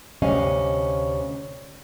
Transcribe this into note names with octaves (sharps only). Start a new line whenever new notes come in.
D2 C3 G3 C#4 D#5 F5